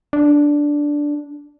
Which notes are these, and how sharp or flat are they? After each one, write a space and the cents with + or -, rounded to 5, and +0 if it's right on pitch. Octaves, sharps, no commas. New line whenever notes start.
D4 -5